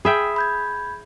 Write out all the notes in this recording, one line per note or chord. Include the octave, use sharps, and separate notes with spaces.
G#4 E5 G5 B5
B5 G6 G#6